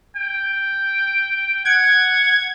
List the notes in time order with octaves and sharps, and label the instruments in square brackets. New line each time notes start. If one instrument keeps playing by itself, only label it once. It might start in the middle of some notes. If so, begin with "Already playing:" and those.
[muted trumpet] G5
[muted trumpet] F#5 [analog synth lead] G#6